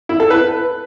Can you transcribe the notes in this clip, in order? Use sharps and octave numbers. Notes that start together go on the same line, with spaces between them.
E4
A4
B4